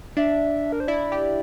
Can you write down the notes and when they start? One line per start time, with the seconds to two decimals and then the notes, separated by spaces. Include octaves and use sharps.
0.17 D4 E5
0.72 A#4
0.80 C5
0.88 E4 D5
1.12 G4